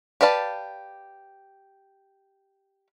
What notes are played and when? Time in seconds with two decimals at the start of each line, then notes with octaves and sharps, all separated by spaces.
0.21 G4 B4 D5 F5 A5